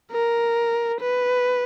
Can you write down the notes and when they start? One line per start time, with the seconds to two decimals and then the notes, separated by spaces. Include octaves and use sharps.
0.12 A#4
1.01 B4